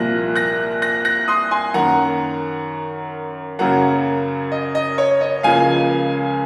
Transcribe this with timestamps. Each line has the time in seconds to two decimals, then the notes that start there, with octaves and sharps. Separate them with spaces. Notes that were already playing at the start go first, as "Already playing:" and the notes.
Already playing: C2 A#2 F3 A#3 F#6 A#6
0.36 F#6 A#6
0.82 F#6 A#6
1.05 F#6 A#6
1.28 C6 D#6
1.51 G#5 C6
1.74 F#2 D#3 A#3 F#5 A#5
3.59 F#2 C#3 F#3 A#3 F#5 A#5
4.52 D#5
4.75 D#5
4.98 C#5
5.21 D#5
5.43 C#2 C#3 F3 A#3 F5 G#5